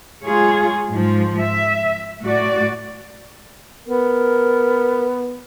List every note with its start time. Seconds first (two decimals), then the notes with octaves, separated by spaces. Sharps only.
0.24 G#3 F4 G#4 C#5
0.90 G#2 F3
1.40 E5
2.22 A2 F#4 D5
3.86 B3 A#4